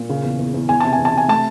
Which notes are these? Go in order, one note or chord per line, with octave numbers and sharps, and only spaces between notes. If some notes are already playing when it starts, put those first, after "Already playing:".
Already playing: A#2
C#3
E2
E2
E2
E2 G#5
C3 A5
G#5
E2
A5
C3 G#5
A3 A5